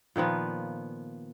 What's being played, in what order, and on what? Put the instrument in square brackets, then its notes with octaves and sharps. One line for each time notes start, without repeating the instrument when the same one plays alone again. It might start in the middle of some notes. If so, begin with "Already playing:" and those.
[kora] A#2 D#3 F3 B3